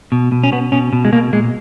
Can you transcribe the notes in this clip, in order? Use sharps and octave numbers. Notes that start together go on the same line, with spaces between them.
B2
B2
C#4
B2 B3
B2 C#4
B2
G#3
B2 A#3
A#2 G#3